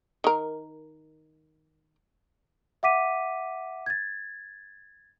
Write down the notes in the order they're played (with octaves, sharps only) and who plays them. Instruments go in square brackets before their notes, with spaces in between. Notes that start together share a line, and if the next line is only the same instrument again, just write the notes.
[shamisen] D#3 A#4
[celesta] E5 F#5 D6 B6 D#7
G#6 A6